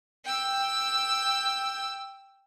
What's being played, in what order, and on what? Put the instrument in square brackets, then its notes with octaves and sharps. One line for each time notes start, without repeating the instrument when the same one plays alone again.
[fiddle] G5 E6